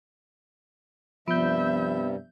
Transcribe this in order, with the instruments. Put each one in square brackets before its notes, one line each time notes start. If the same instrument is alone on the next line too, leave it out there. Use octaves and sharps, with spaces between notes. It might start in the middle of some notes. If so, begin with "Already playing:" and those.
[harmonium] G2 C3 G3 [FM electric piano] F3 G6 [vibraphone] B3 [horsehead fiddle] E5